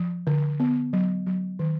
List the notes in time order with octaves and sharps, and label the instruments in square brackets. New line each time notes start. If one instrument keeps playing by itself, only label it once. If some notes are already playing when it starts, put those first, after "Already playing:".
Already playing: [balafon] F3
D3
B3
F#3
F#3
D#3